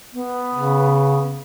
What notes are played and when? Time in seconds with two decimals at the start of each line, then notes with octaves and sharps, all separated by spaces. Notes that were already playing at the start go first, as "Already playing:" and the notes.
0.14 B3
0.54 C#3